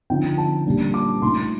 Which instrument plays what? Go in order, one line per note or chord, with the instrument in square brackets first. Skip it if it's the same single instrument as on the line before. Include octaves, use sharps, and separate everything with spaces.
[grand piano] D3 F3 C4 D#4 G5
A5
A#2 G3 A#3 D4
D6
A#2 A3 D#4 C6